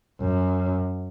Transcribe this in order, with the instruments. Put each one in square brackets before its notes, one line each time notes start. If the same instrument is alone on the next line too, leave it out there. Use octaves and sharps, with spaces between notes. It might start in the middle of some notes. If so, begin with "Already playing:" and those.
[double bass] F#2